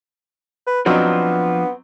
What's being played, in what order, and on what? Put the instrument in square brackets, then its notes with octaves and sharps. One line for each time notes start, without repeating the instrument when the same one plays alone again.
[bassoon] B4
[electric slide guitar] F3 D4 F4 [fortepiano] F#3 C4 D#4 [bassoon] B3